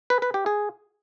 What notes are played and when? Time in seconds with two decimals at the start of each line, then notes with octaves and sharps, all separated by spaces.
0.10 B4
0.22 B4
0.34 G4
0.46 G#4